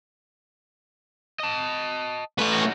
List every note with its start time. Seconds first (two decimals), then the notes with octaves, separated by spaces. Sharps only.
1.40 D#5 A5
2.39 A2 B4
2.53 C#4 D#4 F#4